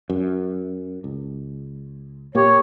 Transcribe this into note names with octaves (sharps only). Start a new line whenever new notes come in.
F#2
C#2
A#2 A#3 G4 C#5